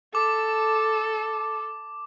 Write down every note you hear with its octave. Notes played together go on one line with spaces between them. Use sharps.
A4 D6